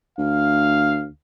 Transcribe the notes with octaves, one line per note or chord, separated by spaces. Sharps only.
D2 F5